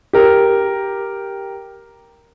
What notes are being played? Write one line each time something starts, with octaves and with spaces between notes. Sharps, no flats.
G4 A#4